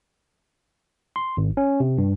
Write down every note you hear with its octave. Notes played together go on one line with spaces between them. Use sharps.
C6
G#1
C#4
C3
G2